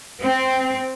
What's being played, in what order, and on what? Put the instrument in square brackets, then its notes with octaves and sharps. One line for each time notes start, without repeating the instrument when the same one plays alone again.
[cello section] C4